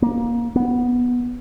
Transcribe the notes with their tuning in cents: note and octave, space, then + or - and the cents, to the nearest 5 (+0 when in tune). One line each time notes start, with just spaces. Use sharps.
A#3 +20
B3 -10